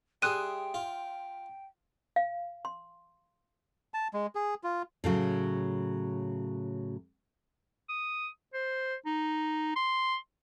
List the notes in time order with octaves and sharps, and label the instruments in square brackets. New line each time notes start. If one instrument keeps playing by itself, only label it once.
[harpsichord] G3 G#4 [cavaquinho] E5 C6 D#6 [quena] G5 [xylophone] F#6 D#7
[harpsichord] F4
[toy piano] F5
C6
[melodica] A5
G#3
G#4
F4
[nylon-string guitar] A2 C#3 F#3
[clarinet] D#6
C5
D#4
C6